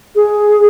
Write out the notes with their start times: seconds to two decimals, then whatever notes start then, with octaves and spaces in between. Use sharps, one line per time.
0.15 G#4